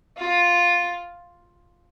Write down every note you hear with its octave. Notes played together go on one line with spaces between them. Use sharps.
F4